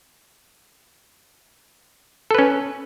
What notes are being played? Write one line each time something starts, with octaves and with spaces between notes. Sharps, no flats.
C#4 A4 B4